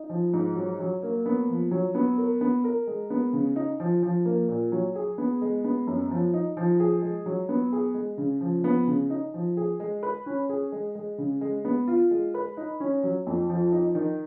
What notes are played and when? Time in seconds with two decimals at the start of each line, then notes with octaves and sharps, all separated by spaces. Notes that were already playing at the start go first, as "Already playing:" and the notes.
Already playing: D#4
0.09 F3
0.33 G#2
0.56 F#3
0.80 F#3
1.03 A#3
1.26 B3
1.49 F3
1.71 F#3
1.95 B3
2.18 A#4
2.41 B3
2.64 A#4
2.87 G#3
3.10 B3
3.33 C#3
3.56 D#4
3.80 F3
4.03 F3
4.25 A#3
4.48 A#2
4.72 F#3
4.95 G#4
5.18 B3
5.42 G#3
5.64 B3
5.87 F#2
6.11 F3
6.34 D#4
6.57 F3
6.80 G#4
7.02 G#3
7.26 F#3
7.49 B3
7.73 G#4
7.94 G#3
8.18 C#3
8.41 F3
8.64 B3
8.87 C#3
9.10 D#4
9.34 F3
9.57 G#4
9.80 G#3
10.03 B4
10.26 C#4
10.49 G#4
10.72 G#3
10.95 G#3
11.18 C#3
11.41 G#3
11.65 B3
11.88 F4
12.11 G#3
12.34 B4
12.57 D#4
12.80 C#4
13.03 F#3
13.27 F2
13.49 F3
13.72 D#4
13.95 D#3